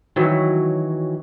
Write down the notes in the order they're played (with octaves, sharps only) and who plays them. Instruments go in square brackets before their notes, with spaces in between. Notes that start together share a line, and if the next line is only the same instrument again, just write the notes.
[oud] D#3 E3 F#3